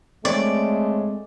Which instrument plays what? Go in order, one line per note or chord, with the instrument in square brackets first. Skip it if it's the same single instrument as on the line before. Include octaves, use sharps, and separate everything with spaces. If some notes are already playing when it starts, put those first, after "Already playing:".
[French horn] G#3 [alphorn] A3 [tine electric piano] C4 C#5 [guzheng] D5